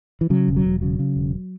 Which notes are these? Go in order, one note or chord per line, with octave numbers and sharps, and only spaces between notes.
E3
C#3 F#3
E1
F#3
E1
C#3 F#3
C#3
E1